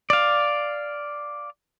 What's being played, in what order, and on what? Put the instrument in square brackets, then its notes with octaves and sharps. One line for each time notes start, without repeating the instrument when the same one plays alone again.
[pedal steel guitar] D5 F5